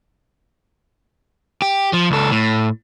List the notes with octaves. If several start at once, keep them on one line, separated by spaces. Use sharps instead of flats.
G4
F3
C#2 A4
A2